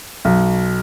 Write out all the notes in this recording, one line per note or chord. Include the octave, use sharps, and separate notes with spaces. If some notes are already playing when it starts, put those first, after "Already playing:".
B1